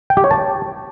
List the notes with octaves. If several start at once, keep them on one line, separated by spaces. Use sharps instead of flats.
G5
G4
C#5
A5